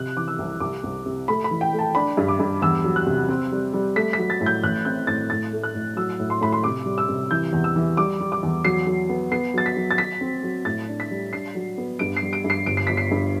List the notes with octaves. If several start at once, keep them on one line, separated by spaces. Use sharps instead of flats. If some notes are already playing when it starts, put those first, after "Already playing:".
Already playing: C3 F#6
E3 D6
E6
C2
C2 D6
C2
C3
A3 B5
B5
E3
G5
A3
A5
D4 B5
G2
D6
G2
E2 E6
F#3
F#6
C3
C4
G3
G3
A3 B6
F#3 B6
A6
A2
G6
A1 F#6
C4 G6
A2 A6
A2 A6
A3
F#6
A2
F#3 E6
A2
C6
A2 B5
C6
C3 D6
G3
E6
C3
E3 G6
E2
E6
E3
G3 D6
G3
D6
E2
F#3 C7
F#3
B3
B3 C7
F#3 A6
B6
F#3
A6
F#3 B6
C4
F#3
A2 A6
D4
B6
G3
D4 C7
F#3
B3
G2 D7
C7
G3
D7
G2
C7
G1 D7
C7
G1 B6
C7
G2